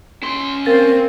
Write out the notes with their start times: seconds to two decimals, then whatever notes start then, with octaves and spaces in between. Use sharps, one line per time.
0.23 C#4 C6
0.66 C4 A#4 F5 A6